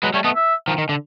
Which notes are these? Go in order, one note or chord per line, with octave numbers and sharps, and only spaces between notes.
F#3 G#3 B4
G3 A3 C#5
A3 B3 D#5
E5
D#3 F3
D#3
D3